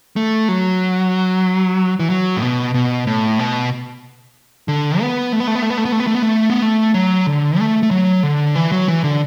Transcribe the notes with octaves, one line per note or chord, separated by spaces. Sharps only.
A3
F#3
E3
F#3
A2
B2
B2
A2
B2
D3
B3
A3
B3
A3
B3
A3
B3
A3
B3
A3
B3
A3
B3
A3
B3
A3
F#3
D3
A3
A3
F#3
D3
E3
F#3
E3
D3